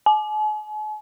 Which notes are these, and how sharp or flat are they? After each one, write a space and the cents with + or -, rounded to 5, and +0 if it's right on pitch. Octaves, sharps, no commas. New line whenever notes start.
G#5 +45